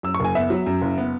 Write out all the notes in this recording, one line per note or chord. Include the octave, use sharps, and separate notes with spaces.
F#2 E6
C#6
F#1 G#5
B3 E5
F#3
F#2
F#1
B3